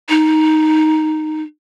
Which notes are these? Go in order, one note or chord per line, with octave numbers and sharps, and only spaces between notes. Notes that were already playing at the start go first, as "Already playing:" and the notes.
D#4